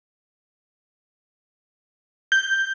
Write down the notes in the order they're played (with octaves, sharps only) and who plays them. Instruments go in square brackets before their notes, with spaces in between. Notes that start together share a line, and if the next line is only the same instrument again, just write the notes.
[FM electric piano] G6